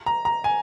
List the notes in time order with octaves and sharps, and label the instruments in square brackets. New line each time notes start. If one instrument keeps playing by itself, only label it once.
[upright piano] A#5
A#5
G#5